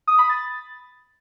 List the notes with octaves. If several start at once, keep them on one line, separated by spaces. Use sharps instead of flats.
D#6
B5
A6